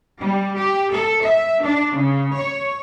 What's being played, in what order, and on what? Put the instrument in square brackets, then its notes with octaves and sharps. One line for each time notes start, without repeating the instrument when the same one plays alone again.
[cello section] G3
G4
A4
E5
D4
C#3
C#5